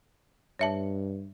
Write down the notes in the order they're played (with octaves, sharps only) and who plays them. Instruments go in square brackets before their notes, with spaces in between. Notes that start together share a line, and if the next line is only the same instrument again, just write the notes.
[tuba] G2 [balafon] C#5 E5 A5